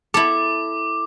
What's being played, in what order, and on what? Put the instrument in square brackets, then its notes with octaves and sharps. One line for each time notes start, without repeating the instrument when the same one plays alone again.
[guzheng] E4 A4 [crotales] D6